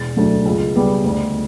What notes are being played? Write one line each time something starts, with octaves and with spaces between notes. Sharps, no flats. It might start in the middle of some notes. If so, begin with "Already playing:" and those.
Already playing: E1 A6
D2 D3 F#3 A3
C#2
C#3 G3 B3
D2